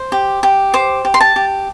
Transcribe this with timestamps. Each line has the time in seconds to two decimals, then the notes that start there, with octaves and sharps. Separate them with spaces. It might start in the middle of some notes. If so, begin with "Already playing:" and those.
Already playing: C5
0.12 G4
0.43 G4
0.74 C5 D6
1.05 G4
1.14 C6
1.21 A5
1.36 G4